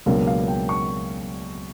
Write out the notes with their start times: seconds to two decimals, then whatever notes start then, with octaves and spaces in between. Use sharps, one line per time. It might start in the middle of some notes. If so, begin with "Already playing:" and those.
0.06 C#2 B2 F#3 A#3 D4
0.27 F5
0.48 G5
0.69 C#6